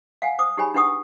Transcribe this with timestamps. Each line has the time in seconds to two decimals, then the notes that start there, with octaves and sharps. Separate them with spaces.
0.22 F5 F#5 G#5
0.39 C5 D6 D#6
0.57 D#4 G4 G#4 C#5 G#5 B5
0.74 D4 E4 B4 F#5 C#6 D#6